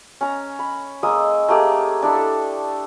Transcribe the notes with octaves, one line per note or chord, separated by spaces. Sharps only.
C#4 A#5
B5
G#3 A#3 D#6 E6
A3 A#3 G4 G#4
D4 E4 A4
A4